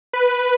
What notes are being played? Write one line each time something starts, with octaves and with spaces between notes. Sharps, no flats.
B4